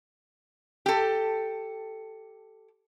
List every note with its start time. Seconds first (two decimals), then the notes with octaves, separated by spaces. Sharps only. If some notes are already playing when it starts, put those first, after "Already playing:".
0.86 G4 A4